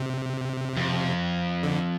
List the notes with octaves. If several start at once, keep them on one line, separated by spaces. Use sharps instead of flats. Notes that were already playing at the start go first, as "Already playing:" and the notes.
Already playing: C3
F2
D3